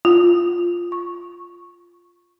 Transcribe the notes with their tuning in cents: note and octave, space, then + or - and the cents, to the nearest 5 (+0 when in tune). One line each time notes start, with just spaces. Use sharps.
F4 -5
C#6 -10